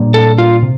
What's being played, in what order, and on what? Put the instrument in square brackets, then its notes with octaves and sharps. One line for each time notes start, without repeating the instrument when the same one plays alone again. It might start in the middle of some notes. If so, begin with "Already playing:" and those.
Already playing: [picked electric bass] A#2 G3 A#3 D4
[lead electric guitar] A4
F4
[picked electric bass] C3